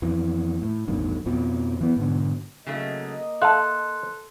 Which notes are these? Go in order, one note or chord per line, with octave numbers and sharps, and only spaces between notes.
F2 E3
A2
A1 E2 G2 D#3
F2 B2 F3
E3 B3
G#2 B2 D3
C#3 F#3 A3 A#3 D#5
A4 E5 F5 A5 C6 F#6